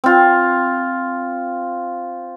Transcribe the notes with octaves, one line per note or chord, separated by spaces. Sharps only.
C4 F4